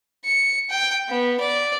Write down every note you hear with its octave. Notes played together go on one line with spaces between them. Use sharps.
C#7
G5
B3
D5